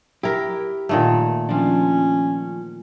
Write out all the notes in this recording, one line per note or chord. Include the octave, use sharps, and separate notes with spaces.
E4 G4 A#4
A#2 D#3 A3
F3 C#4 D4